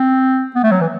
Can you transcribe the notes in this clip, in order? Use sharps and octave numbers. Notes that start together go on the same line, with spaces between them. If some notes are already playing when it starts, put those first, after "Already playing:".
Already playing: C4
B3
A3
F#3
E3